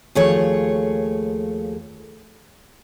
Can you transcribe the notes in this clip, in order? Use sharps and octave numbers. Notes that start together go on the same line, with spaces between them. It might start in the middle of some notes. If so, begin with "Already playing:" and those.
D#2 F3 A3 G#4 C#5